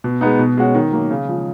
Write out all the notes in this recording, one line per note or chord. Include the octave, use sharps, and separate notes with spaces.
B2
G#3 B3 D#4
B2
G#3 C#4 F#4
D#3
F#3 A#3
C#3
F3 G#3